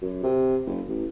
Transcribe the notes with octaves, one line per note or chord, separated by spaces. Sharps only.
F#2
C3
F#1
A1